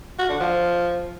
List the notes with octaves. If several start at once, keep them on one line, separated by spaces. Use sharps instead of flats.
F#4
D3
F3